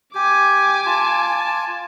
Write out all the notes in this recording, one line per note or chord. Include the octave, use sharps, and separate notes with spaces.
G4 G#5 D6
F4 A5